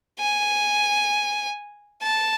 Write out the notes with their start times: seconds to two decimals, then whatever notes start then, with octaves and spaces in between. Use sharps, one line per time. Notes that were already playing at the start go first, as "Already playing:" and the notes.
0.19 G#5
2.03 A5